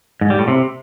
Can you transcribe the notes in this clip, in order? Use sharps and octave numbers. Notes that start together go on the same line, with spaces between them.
G#2
G3
A2
C3